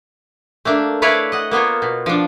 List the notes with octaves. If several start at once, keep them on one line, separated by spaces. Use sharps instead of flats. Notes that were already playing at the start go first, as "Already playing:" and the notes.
A3 A#3 D4
E4 B4 C#5 D5 F5
D#5 F#5
A#3 B3 F4 C#5
B2
F3 D4